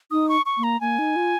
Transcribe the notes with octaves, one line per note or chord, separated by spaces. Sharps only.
D#4 D#6
C#6
C#6
A#3
A#5
A#3 G#5
D#4
F4